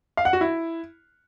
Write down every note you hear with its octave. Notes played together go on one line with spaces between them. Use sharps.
F5
F#5
F#4
E4